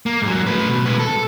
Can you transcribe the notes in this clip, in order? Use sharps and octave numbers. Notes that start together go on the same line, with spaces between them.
A#3
G#2 F#3
A3 B4
B2
G#3 B4
A4